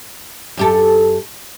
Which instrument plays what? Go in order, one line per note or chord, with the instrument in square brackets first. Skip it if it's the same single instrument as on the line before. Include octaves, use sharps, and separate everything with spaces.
[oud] F#2 G4 A4